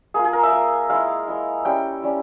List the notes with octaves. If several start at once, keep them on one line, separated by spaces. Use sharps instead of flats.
A#3 F4 G#4
G#4
A#4
E5
A#3 F4
G#3 E4 F5
G#3 E4
G3 C#4 E4 G5
G3 C#4 E4